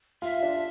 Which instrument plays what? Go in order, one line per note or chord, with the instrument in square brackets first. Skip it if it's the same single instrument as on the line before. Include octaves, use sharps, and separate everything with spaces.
[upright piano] F4 [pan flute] E5
[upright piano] D4